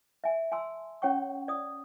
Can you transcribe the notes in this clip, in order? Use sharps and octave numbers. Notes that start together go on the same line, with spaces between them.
E5 G#5
G#5 A5 C6 E6
C#4 C#5 F#5 G5 C#6
D5 D#6